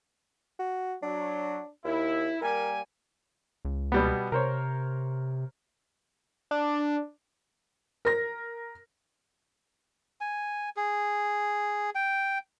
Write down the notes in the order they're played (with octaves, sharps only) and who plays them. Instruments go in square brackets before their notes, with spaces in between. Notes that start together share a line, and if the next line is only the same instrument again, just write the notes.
[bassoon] F#4
[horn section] F#3 [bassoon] D4
[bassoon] D#2 [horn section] E4
[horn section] G3 A#3 G#5 [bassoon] A#4
[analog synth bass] C#2
[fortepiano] B2 G3 B3
[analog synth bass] C3 [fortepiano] A#4 C5 C#5
[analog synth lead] D4
[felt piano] A#4 A#6
[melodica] G#5
G#4
G5